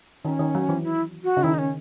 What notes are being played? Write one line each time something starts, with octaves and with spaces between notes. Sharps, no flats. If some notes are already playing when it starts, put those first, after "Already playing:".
D#3 C#4
D#3
F#3
E3
E4
F#4
C#3
D#3 E4
D#4
C#4